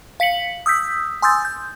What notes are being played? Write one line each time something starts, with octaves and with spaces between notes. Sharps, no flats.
F5 B6 C#7 F#7
D#6 E6 G6 B6
G#5 C6 D#6 E6 G6 A6
G6